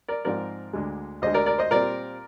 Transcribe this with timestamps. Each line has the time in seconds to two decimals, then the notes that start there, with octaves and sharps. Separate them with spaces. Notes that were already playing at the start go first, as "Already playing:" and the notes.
0.08 A#4 D5
0.25 G#2 F3 C4 A#4 D5
0.73 D2 D3 G#3
1.22 D2 D3 G#3 C5 D#5
1.34 A#4 D5
1.46 A#4 D5
1.58 C5 D#5
1.71 A#2 G3 C4 A#4 D5